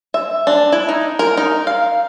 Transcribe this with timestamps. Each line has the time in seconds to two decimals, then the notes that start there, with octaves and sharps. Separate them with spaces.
0.14 E5
0.47 D4
0.72 E4
0.89 D#4
1.19 A#4
1.37 D#4
1.67 F5